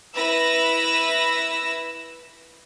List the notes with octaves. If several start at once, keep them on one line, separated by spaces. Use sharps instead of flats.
E4 B4 E6 A#6